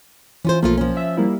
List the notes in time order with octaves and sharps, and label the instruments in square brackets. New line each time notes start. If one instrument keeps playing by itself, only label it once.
[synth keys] E3 [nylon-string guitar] C#4 F4 C5
[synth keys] B1 A#3 [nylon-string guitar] F3 A3 F4
[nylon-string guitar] F3 C#4
[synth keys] E5
G3 A#3 E4